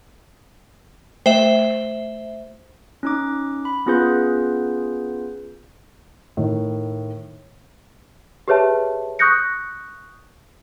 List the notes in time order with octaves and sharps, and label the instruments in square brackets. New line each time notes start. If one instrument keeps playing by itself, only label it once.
[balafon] A3 [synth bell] C5 E5
[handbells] C#4 D#4 D6
B5
B3 C#4 F4 G#4 B4 G6
[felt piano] A2 D#3
[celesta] G4 G#4 B4 C#5 E5 A5
C#6 D#6 F#6 G6 A#6 C#7